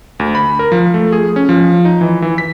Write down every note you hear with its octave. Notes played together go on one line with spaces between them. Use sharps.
D2
B5
A#4
F3
A3
G#4
C#4
F3
D#4
E3
E3
B6